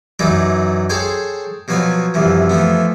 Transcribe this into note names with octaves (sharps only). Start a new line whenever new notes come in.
F#2 E3 F#3 D#4 B4 D5
G#4 A4 C5 C#5 G5 G#5
B2 F3 F#3 B4 C#5 G#5
C2 F#2 E3 F3
E3 F3 A3 B3